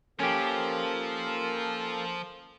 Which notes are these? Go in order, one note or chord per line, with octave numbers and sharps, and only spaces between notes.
F3 A#3 C#4 G4 A4 A#4